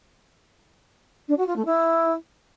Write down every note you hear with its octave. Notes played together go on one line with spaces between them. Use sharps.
D4
F#4
F4
A3
E4